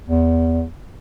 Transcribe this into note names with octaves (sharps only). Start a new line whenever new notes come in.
E2